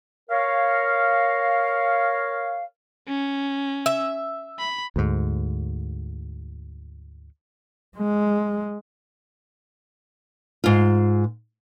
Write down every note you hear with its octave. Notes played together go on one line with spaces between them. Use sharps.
A#4 C#5 F5
C#4
E5
B5
D2 G#2
G#3
G#2 F4